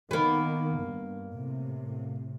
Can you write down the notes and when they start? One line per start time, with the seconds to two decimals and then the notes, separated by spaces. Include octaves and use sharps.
0.11 D#3 A#3 B3
0.83 G2
1.34 A2 C3